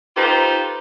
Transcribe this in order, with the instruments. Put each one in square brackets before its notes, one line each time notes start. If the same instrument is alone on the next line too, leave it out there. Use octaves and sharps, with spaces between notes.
[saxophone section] D#4 F4 G4 A4 B4 C5